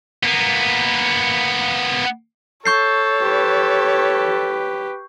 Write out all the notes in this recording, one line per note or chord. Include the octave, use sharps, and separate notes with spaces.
A#3 B3
A4 C#5 C#6 G6 C7
G4 B4